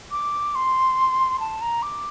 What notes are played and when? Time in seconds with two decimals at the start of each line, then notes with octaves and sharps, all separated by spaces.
0.11 D6
0.55 C6
1.40 A5
1.62 A#5
1.83 D6